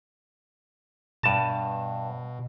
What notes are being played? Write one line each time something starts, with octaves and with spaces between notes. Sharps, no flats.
G2 B2 A5